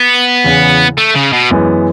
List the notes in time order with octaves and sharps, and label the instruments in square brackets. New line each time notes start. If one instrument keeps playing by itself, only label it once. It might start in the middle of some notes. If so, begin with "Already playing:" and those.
Already playing: [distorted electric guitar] B3
[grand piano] E2 C#3 E3
[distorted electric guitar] A3
C#3
B2
[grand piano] F#2 E3 G#3 B3